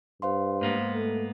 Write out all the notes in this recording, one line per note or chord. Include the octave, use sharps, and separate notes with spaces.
G2 C5 F5 C6
G#2 A#3 B3
A3